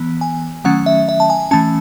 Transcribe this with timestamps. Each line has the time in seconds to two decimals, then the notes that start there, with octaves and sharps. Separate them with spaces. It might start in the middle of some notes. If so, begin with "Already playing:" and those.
Already playing: E3 B3
0.21 G#5
0.64 D#3 F#3 A3 C#4 F#5
0.86 E5
1.09 E5
1.20 A5
1.30 G#5
1.51 E3 A3 C#4 A5